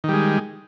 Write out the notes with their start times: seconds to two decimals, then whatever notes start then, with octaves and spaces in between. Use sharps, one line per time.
0.04 D#3
0.09 G3
0.13 G#3